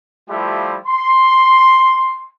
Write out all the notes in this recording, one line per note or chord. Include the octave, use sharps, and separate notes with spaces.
F3 G3 A3 E4 F4 G4
C6